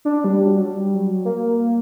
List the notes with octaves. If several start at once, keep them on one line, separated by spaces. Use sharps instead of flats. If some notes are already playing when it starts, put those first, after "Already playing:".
D4
G3
F#3
G3
F#3
A#3